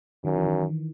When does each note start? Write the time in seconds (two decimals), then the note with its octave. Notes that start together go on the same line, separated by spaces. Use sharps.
0.25 F#2 D#3
0.36 E3
0.47 D#3